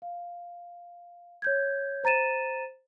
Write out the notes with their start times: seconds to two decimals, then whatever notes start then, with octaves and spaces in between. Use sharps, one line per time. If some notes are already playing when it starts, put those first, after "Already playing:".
0.02 F5
1.42 C#5 G6 G#6
2.04 C5 A#5 A6 D#7 E7